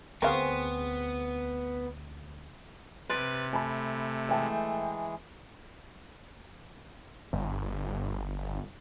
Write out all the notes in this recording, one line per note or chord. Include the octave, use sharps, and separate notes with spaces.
D2 B3 C4 F#4 G#4 A#4 F5
C3 B4 C6 A6 D7
A3 G#5 A5 B5
E3 G#3 E5 G5 A5
G1